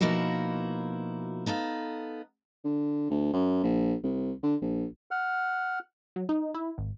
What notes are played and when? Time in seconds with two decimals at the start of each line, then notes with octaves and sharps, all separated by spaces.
0.01 B2 F3 A#3 D#4 E4 F#4
1.46 B3 D#4 A4 F5
2.64 D3
3.10 D2
3.33 F#2
3.64 A#1
4.04 C2
4.43 D3
4.61 A#1
5.11 F#5 F6
6.16 F#3
6.29 D#4
6.54 E4
6.78 G#1